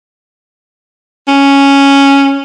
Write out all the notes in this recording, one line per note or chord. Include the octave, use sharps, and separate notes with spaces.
C#4